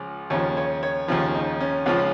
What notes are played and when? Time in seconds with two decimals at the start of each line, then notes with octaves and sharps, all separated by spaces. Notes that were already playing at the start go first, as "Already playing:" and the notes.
Already playing: C#2 C#3 F3
0.30 D#2 C#3 F3 C#5
0.57 C#5
0.83 C#5
1.08 D#2 C#3 F3
1.35 D#4
1.60 C#4
1.86 C#2 C#3 F3